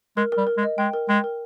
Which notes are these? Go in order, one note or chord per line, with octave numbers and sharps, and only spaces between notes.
G#3 A#4
A#4
G3
A#4
G#3
D#5
G#3 G5
A#4
G#3 G5
A#4